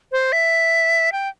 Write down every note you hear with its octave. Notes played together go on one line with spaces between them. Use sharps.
C5
E5
G5